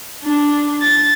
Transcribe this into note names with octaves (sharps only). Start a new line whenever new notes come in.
D4
A6